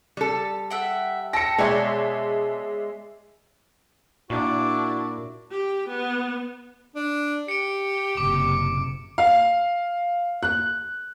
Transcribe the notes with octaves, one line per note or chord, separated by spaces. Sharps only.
G3 A4
E5 F#5 G5
G5 A5 E6 A#6 C#7
B2 G#3 C#5 D5 E5 A#5 C6
A#2 D4 E4 F#4
G4
B3
D4
G4 C#7 D7
F#1 C3 D6
F5
F#6